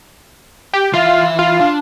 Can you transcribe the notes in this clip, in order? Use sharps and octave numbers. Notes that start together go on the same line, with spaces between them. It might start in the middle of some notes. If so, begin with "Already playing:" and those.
G4
E3 F4 E5
F4
D4